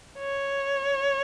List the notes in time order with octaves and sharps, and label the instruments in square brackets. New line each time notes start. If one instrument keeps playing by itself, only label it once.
[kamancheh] C#5